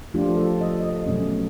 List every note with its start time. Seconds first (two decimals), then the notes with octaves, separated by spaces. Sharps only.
0.14 F3 A3 D4 F4 G4
0.37 A4
0.61 D#5
0.83 D#5
1.06 B2 F#3 A3 C#4